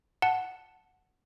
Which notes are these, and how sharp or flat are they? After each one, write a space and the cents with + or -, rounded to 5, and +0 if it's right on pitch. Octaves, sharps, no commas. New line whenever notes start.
F#5 +0 A5 +0